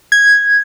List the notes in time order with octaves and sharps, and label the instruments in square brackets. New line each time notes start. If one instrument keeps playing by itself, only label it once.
[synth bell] G#6